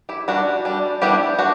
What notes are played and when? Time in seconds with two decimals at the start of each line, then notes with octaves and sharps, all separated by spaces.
0.09 E4 G4
0.28 G3 D4 F#4
0.65 G3 D4
1.02 G3 B3 D4 E4 G4
1.39 D4 F#4